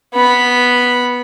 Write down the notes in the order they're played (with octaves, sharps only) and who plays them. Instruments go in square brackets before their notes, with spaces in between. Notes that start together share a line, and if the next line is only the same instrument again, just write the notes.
[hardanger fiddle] B3 B5